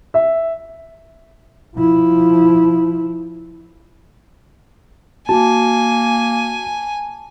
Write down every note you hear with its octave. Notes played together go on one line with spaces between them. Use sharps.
E5
F3 E4
A#3 F#4 G#5 A5